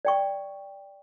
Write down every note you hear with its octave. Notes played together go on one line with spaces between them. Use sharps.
D5 G5 C#6